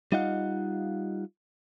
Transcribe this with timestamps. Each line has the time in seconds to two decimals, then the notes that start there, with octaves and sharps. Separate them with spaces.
0.12 G3 D#4 F4 D#5 F5 F#5